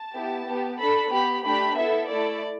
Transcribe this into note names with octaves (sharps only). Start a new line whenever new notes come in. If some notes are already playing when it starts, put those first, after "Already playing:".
Already playing: A5
B3 E4 G4
B3 G4
D4 A4 B5
B3 G4 B5
A3 D4 G4 B5
B3 E4 A4 E5
A3 E4 A4 D5